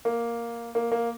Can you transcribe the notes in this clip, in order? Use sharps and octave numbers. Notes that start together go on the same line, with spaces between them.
A#3
A#3
A#3